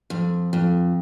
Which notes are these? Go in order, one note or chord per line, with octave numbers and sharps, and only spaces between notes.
F2
F2